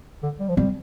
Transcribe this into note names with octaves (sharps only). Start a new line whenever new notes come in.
D3
G3
F3
G3 C4